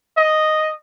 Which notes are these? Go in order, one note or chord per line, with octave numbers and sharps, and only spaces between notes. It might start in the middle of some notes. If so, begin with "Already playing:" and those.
D#5